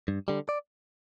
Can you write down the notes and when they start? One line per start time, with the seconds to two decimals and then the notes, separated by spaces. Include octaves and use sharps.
0.08 G2
0.28 D3 G3
0.49 D5